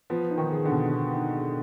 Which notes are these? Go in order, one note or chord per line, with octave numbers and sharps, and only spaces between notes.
F3 B3
D#4
D#3
G#4
D3
B2
B3
D#4
G#4